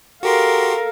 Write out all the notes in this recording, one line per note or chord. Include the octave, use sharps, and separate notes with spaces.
F#4 G4 A4 A#4 F5 C6